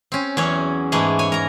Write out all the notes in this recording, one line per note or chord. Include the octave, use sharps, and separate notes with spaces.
C4 C#4
E2 F#3 C#4 C#5
G#2 E3 A3 G#4
C#5 G#5
A#4 A#5